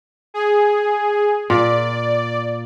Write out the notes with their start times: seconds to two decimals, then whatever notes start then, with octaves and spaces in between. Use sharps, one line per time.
0.34 G#4
1.50 A#2 D5